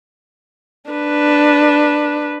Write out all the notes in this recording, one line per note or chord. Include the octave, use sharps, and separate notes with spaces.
D4 B4